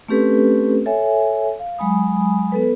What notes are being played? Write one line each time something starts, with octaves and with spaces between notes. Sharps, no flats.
A3 C4 C#4 G4 A4 B4
A4 C#5 E5 G#5
F5
F#3 G#3 G#5 B5 D#6
B3 A4 B4